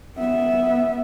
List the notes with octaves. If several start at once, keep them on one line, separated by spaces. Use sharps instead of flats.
B3 E5